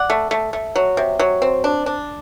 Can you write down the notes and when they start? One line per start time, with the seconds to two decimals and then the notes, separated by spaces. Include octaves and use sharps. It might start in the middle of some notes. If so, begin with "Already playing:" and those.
Already playing: D5 F#5
0.10 A3
0.31 A3
0.53 A3
0.75 F#3
0.97 C3
1.19 F#3
1.42 C4
1.64 D4
1.86 D4